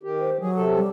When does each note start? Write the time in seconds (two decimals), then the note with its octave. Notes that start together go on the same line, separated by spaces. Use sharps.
0.03 D#3 G4
0.19 C5
0.41 F#3 G#4
0.56 C3 A4
0.76 G3